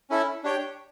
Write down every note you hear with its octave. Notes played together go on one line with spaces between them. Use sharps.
C#4 E4 A4 E5
D4 G4 C#5 G5